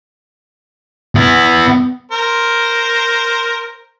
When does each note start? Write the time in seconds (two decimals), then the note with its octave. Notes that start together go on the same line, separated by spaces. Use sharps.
1.15 B3 E4
2.12 A#4 C5